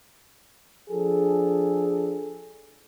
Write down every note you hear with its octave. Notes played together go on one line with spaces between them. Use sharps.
F3 D4 G#4 A4